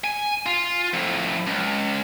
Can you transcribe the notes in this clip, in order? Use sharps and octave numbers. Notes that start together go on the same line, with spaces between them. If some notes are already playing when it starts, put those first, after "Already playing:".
G#5
F4
F2 A2
C#2